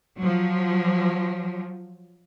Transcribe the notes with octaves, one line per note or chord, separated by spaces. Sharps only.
F3 F#3